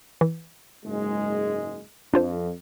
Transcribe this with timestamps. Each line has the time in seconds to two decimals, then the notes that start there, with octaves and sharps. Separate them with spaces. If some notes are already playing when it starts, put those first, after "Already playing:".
0.21 E3
0.84 F#1 G#2 G#3
2.14 F2 D4 F4 C5